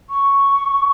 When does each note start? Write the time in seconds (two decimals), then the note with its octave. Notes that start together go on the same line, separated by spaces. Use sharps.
0.10 C#6